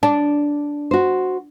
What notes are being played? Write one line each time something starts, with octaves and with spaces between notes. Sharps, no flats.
D4 A5
F#4 C5